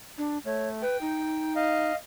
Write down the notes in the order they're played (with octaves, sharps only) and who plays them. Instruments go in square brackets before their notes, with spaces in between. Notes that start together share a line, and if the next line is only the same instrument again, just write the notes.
[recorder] D4
[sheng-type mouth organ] A3 [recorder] C#5
[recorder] B4 [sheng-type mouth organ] G5
[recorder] D#4
[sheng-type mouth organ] D#5 F5